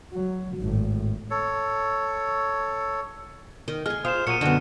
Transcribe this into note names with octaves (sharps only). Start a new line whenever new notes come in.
F#3
G#1 A2
A4 C#5
D#3 D#5
G#3 G#4 G#5 F6
F4 C5 D#6 E7
A#2 F#3 C#7 D#7
F#2 D3 B3 F#4 D#5 G5